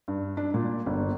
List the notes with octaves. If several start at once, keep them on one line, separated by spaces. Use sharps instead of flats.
G2
D4
A#2
G1